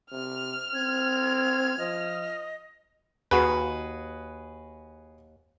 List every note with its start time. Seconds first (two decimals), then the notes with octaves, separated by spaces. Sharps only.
0.12 C3 F6
0.74 C4 G#6
1.78 F3 D#5
3.31 D#2 F#4 G#4 B4